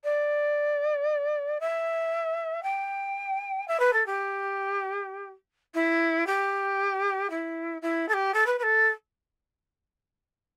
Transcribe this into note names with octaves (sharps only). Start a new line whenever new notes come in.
D5
E5
G5
E5
B4
A4
G4
E4
G4
E4
E4
A4
G4
A4
B4
B4
A4